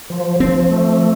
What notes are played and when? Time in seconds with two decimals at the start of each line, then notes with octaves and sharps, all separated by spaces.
0.10 F3
0.40 F3 C4
0.71 A3